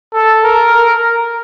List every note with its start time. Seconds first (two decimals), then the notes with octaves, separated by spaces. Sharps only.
0.13 A4
0.44 A#4
0.73 A#4